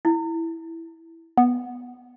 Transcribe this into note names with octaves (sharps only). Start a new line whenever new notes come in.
E4
B3